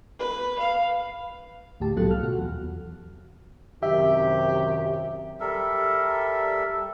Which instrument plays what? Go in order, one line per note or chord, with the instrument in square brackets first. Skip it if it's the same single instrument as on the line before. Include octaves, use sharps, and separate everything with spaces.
[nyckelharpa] B4
F5
[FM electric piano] D2 A2 G4 A5
C2 B2 F#3 F4 A4 F#6
F6
F#4
E2
[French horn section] F#2 C3 D#3 [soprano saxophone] G4 [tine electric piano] E5
[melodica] G3 A4 A#4 E5